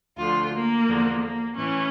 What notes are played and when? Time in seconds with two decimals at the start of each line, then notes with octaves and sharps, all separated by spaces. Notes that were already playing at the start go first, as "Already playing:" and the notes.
0.18 D2 D3 F3 F4
0.52 A#3
0.87 E2 D3 F3
1.21 A#3
1.56 A2 E3 C#4